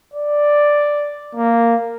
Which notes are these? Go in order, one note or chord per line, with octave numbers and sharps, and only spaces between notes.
D5
A#3